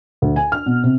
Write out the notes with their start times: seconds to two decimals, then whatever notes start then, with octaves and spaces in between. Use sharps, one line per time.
0.22 D2
0.36 G#5
0.52 F6
0.66 B2
0.84 C3